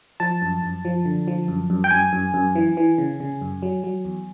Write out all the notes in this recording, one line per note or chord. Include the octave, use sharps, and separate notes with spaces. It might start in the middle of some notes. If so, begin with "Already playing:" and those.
F3 A5
F#2
F#2
F3
D3
F3
F#2
F#2
G5
F#2 G#5
F#2
F#2
E3
E3
C#3
C#3
F#2
F#3
F#3
E2